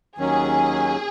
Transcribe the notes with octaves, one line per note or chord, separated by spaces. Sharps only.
D#2 D#3 F#3 C#4 G#4